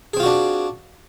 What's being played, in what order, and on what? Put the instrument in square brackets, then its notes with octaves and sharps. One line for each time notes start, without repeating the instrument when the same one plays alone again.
[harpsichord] G#4
C4
F4
F#4
D4